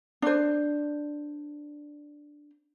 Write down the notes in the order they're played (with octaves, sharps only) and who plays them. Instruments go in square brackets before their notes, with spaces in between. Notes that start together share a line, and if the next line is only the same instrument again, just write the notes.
[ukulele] D4 C5